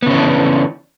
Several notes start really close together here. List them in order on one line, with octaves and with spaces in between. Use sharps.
B3 C#3 C#4 E3 D4